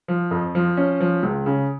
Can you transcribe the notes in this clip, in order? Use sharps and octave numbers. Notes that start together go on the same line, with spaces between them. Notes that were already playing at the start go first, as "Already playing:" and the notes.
F3
F2
F3
C#4
F3
C#2
C#3